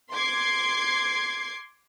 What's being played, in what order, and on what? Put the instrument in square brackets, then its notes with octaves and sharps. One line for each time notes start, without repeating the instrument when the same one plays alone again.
[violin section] C6 D6 G#6 C7